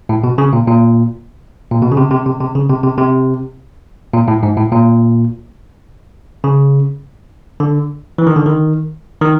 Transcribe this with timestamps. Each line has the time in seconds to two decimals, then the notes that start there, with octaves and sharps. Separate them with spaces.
0.09 A2
0.24 B2
0.38 C#3
0.53 A#2
0.67 A#2
1.71 A#2
1.82 B2
1.92 C#3
1.97 C3
2.11 C3
2.26 C3
2.40 C3
2.55 C#3
2.69 C3
2.84 C3
2.98 C3
4.14 A#2
4.28 A2
4.43 G#2
4.57 A2
4.72 A#2
6.44 C#3
7.60 D3
8.18 E3
8.27 D#3
8.36 D3
8.46 D#3
9.21 D#3